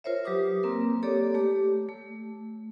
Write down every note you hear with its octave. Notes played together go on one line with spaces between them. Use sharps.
F4 A#4 C5 C#5 E5
F#3 G4 B4 D6 D#6
A#3 C4 A#4
A#3 G4 A4 C#5 D5 D6
A3 G4
A3